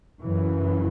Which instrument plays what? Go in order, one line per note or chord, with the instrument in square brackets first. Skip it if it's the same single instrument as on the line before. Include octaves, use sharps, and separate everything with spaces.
[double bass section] F#2 C#3 E3